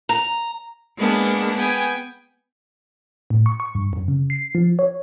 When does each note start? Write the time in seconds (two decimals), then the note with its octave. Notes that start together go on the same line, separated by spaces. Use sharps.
0.09 A#5
0.96 G#3 A#3 B3 D4
1.57 B3 G5 G#5
3.30 A2
3.46 C#6
3.60 C#6
3.75 G2
3.93 F#2
4.08 C#3
4.30 C7
4.55 F3
4.79 C#5